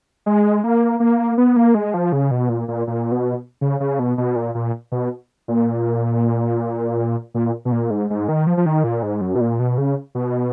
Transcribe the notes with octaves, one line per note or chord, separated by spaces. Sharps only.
G#3
A#3
A#3
B3
A#3
G#3
F3
C#3
B2
A#2
A#2
A#2
B2
C#3
C#3
B2
B2
A#2
A#2
B2
A#2
A#2
B2
A#2
G#2
G#2
D#3
F3
F3
D#3
A#2
G#2
F#2
B2
A#2
B2
C#3
B2